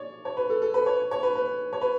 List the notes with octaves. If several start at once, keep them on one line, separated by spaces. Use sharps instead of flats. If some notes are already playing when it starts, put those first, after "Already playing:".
Already playing: C#5 D5
C#5
B4
A4
A4
B4
C#5
C#5
B4
B4
C#5
B4